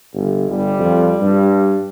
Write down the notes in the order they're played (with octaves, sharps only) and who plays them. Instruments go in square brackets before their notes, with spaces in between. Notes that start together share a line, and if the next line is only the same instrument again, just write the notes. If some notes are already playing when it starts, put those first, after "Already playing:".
[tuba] G1
[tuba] G1 [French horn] G3
[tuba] F2
G2